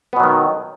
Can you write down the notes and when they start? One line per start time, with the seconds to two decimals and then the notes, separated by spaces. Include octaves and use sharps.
0.13 B3
0.16 B2
0.20 F#3
0.23 D#3